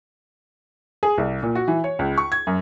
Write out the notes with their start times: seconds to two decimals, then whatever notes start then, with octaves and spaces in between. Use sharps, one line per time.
1.03 G#4
1.18 C2
1.43 A#2
1.55 F#4
1.68 E3
1.84 C#5
1.99 C#2
2.18 C#6
2.32 G#6
2.47 F#2